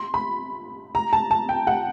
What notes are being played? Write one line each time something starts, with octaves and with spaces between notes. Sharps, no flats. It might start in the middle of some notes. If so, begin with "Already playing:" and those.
Already playing: C6
B5
A#5
A5
A5
G5
F#5